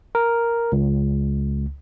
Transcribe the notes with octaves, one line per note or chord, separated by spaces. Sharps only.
A#4
C#2